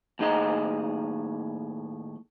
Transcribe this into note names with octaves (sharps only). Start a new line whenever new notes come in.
D#2 A2 D#4 G#4 D#5